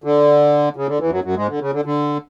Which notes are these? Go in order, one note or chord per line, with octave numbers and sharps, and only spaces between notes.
D3
C#3
D3
E2 E3
F#2 F#3
F#2 F#3
G#2 G#3
D3
C#3
D3
D3